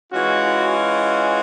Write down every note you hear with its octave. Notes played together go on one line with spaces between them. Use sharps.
E3 G#3 C#4 F4 F#4
F#4